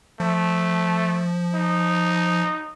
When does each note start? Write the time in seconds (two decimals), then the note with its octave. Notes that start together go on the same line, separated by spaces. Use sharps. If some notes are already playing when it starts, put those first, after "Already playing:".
0.20 F3 A3
1.54 D#4